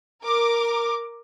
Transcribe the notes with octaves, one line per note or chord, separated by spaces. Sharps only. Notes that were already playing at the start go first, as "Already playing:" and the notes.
A#4 D6